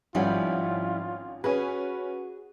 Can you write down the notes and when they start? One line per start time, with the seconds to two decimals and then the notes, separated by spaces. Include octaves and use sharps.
0.15 G#1 F3 G3 C#4 E4 F4 F#5
1.44 C#4 F#4 G#4 B4